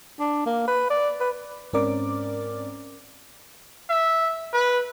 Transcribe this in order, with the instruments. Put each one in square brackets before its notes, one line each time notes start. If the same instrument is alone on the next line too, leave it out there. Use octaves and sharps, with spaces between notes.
[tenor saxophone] D4
A#3
B4
D5
B4
[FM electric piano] G#2 C4 C#4 A#4 D5 D6
[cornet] E5
B4